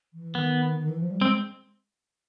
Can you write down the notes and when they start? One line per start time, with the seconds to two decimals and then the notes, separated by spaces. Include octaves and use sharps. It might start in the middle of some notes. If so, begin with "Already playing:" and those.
0.13 E3
0.35 D#3 B3
0.79 D#3
0.89 E3
1.00 F3
1.10 G3
1.21 G#3 C4